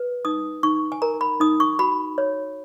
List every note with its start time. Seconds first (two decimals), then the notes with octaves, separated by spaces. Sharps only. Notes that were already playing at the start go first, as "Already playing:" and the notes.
Already playing: B4
0.25 D#4 D#6
0.63 D#4 C#6
0.92 G#5
1.02 A#4 A#5
1.21 B5
1.40 D#4 D#6
1.60 C#6
1.79 F#4 B5
2.18 C#5